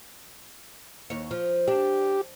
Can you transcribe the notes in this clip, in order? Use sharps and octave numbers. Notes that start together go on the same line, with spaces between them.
D#2 C#5
F3
D4 G4